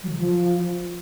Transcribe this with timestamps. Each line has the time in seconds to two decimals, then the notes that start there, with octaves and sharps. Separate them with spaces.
0.03 F#3
0.08 D#3
0.13 C#3
0.18 F3